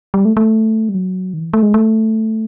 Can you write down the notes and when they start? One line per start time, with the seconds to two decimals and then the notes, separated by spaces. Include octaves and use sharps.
0.14 G3
0.25 A3
0.37 A3
0.89 G3
0.95 F#3
1.34 D#3
1.40 E3
1.54 A3
1.63 G#3
1.74 A3